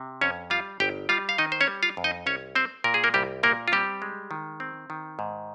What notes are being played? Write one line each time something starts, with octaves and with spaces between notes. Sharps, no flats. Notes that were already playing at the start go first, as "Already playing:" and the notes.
Already playing: C3
F2 C#4 C#5
G3 F4 F5
G1 G4 G5
G3 F4 F5
F5
D#3 D#4 D#5
C5
C#4 C#5
G3
F4 F5
F2
D#4 D#5
C2 C#4 C#5
C4 C5
A#2 A#4
G#4
A#3 A#4
C2 G3 G4
A#2 A#3 A#4
F4
G3 C4 G4
G#3
D#3
C4
D#3
G#2